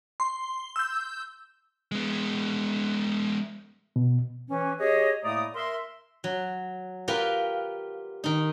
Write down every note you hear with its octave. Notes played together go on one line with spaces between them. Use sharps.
C6
E6 G6
G#3 B3
B2
E3 C#4
G4 G#4 C#5 D#5
A2 A3 A#3 D5 A#5 D#6
A#4 E5 C6
F#3
F4 G4 A#4 B4 F5
D#3 D#4